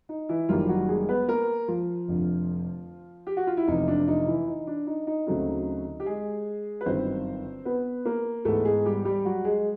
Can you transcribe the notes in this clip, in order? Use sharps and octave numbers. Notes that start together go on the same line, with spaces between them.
D#4
E3 E4
F#1 F#2 D#3 F3 G3 A#3 F4
F#3 F#4
G#3 G#4
B3 B4
A#3 A#4
F3 F4
F1 F2 D3
G4
F#4
F4
E4
F1 E2 C3 D#4
D4
D#4
E3 E4
D#4
D4
D#4
D#4
D2 C#3 F#3 A3 C4 D#4
G4
G#3 G#4
B4
G1 F#2 D#3 C4 C5
B3 B4
A#3 A#4
G#2 E3 G#3 A3 B3 A4
G#3 G#4
G3 G4
G3 G4
F#3 F#4
G#3 G#4